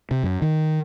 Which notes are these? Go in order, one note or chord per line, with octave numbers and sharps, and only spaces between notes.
C3
F#2
D#3